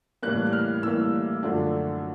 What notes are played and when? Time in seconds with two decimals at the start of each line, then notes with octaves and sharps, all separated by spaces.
0.22 A2 E3 G3 A#3 F#6
0.47 F#6
0.53 F6
0.83 A2 E3 G3 A#3 E6
1.43 F#2 D3 F3 A3 D4